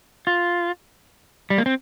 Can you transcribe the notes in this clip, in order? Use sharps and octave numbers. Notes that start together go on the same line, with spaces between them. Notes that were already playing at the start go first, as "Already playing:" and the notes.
F4
G3
A#3
C4